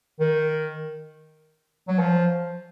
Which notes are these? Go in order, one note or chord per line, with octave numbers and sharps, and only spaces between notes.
D#3
F#3
F3